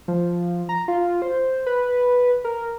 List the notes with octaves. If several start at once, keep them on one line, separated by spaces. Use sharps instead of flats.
F3
A#5
F4
C5
B4
A#4